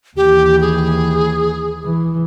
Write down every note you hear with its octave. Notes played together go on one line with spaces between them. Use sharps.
D#2 E3 G4
G#4
E3